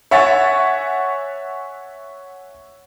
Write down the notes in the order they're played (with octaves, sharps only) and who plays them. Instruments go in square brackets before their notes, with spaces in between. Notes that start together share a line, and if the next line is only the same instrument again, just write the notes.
[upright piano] C#5 E5 F#5 G#5 C#6 A6